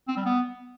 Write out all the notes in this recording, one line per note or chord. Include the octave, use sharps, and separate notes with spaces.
C4
G3
B3